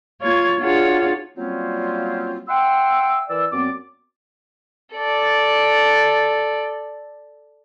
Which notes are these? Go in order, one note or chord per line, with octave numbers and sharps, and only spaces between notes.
A#3 F4 C#5 G#6
D4 F4 F#4 G#4 C#5
F#3 G3 A#3 C4 C#4 F4
E5 F#5 G5 C6 E6
E3 A#4 D5 E6
F#2 B3 C4 D5 D6
A4 D5